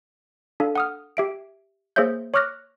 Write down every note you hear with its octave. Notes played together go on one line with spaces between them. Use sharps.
D4 A4 F5
F#5 D#6 F6
G4 E5 D7
A#3 G#4 C5 C#5 E5 G6
C#5 C#6 D6 F6 F#6 A#6